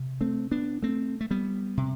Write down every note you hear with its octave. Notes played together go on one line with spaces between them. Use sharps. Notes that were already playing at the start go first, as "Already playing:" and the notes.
Already playing: C3
A3 C4
B3 D4
A3 C4
A3
G3 B3
C3